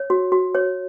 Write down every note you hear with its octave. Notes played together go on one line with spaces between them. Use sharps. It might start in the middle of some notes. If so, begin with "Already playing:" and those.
Already playing: C#5
F#4
F#4
C#5